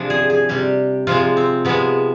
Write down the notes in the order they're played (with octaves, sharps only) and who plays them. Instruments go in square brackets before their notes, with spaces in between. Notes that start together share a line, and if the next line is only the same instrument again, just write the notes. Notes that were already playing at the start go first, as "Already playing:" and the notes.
Already playing: [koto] C3 F3 G#3 D4
G#4
G#4
C3 G3 G4
C3 F3 G#3 F4
C4
C3 F3 G#3 B3